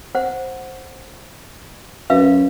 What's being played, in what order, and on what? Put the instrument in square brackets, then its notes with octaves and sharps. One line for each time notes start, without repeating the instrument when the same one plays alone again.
[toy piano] C5 F#5
[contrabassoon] F#2 [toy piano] B4 E5 F5